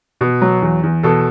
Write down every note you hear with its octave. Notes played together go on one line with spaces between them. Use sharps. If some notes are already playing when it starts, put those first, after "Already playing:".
B2
F#3
E2
E2
B2 A4